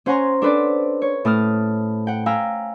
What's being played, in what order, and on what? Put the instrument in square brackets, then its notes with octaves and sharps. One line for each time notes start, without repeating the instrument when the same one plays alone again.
[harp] C#4 C5 F#5 G#5 A#5 C6
D4 A4 B4 C5 D5
C#5
A2 A5 D#6 F6
F#5 G5
F5 G5 G#5 A#5 B5 E6